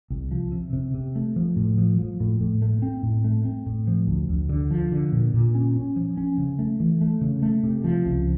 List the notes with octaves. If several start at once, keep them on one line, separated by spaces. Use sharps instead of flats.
C2
F3
C3
C3
C3
A3
F3
A2
F3
F3
A2
A2
A3
C4
A2
A3
C4
A2
F3
D2
D2
D3
F3
D3
A#2
A#2
C#4
C#4
F3
C#4
C#3
A3
E3
A3
C#3
A3
C3
F3
C#2